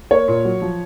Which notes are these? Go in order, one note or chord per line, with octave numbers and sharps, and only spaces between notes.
A#3 C#5
A#2
F#3
F3